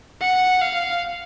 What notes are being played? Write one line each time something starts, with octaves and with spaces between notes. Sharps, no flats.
F#5
F5